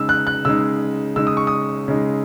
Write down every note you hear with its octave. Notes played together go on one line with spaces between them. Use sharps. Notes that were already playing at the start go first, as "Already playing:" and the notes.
Already playing: C#3 G#3 D#4 E6
F#6
F#6
C#3 G#3 D#4 E6
C#3 G#3 D#4 E6
D#6
C#6
D#6
C#3 G#3 D#4